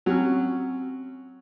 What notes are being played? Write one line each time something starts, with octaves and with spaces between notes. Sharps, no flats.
F#3 C4 C#4